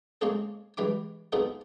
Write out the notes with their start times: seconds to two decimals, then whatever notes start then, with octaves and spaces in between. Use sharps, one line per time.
0.21 G#3 A#3 C4 C#4 G#4 A4
0.77 G2 E3 G#3 G5 B5 D6
1.32 B3 C4 D#4 F4 G#4 A4